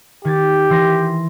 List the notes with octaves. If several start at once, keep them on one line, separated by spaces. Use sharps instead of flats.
D#3 G4 G#6 A6
E3 C6 A#6